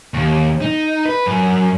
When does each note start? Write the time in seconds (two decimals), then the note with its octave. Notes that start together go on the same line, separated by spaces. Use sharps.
0.14 D#2
0.61 D#4
1.06 B4
1.26 F#2